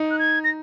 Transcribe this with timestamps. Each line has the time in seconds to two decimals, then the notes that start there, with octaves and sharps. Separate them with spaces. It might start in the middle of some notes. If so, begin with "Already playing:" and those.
Already playing: D#4
0.11 F#6
0.19 G#6
0.44 A#6